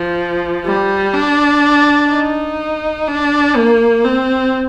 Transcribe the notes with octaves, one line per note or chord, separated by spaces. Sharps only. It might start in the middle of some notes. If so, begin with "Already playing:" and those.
Already playing: F3
G3
D4
D#4
D4
A#3
C4